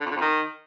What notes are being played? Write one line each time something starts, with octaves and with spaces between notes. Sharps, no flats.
D3
F2
D3
F2
D#3